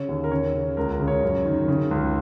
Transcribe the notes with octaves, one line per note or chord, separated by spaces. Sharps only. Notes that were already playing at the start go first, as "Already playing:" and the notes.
Already playing: C#3 C#5
D#2
A#4
C#3 C#5
C#3
C#2 A#4
A#4
C#3
C#5
F#2
D#3
C#3
C#2